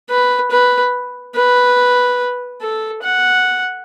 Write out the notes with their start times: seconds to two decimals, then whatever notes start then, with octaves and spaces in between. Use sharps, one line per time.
0.09 B4
0.51 B4
1.35 B4
2.61 A4
3.03 F#5